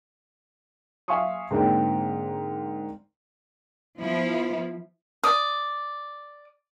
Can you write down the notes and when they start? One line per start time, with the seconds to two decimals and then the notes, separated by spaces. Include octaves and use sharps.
1.08 E5 F5 G#5 C6 C#6 D#6
1.51 G#2 D3 A#3 C4 G5
3.99 F3 B3 E4 F4
5.24 D5 D#6